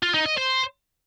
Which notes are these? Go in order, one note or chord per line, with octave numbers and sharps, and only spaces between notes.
F4
D#4
D#5
C5